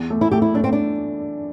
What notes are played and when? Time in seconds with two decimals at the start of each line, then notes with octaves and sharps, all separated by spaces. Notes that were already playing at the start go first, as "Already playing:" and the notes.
Already playing: E2
0.10 A3
0.21 E4
0.31 A3 G4
0.42 E4
0.54 A3 D4
0.64 C4
0.73 D4